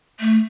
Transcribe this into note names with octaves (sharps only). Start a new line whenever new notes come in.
A3